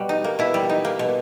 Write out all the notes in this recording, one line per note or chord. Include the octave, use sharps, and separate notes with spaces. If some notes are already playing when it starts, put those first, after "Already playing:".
Already playing: B2 G3 F#4
D#4
A#3
B2 E4
G3
D#4
A#3
B2